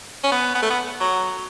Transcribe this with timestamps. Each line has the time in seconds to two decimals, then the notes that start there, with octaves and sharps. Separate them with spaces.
0.24 C#4
0.32 B3
0.55 B3
0.62 A3
0.70 B3
1.00 F#3